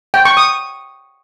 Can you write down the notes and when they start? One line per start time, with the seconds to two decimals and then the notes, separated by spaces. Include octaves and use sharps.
0.14 G5
0.25 C#6
0.37 D#6